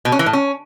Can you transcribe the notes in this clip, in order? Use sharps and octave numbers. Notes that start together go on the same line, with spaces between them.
B2
C#4
E3
A2
C#4